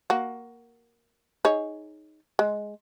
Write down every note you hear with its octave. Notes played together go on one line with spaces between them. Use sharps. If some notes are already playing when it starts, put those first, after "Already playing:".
A#3 F#4
D#4 G#4 C#5
G#3